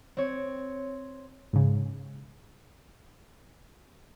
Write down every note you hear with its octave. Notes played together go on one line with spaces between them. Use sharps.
C4 C#5
G#2 C#3